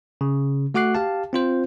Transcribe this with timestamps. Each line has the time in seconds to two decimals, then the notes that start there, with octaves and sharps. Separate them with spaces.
0.21 C#3
0.74 A3 F#4 F#5 D6 F#6 C7
0.95 G4 F5 A5
1.33 C4 F4 C5